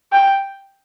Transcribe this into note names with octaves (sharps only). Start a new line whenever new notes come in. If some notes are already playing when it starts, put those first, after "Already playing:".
G5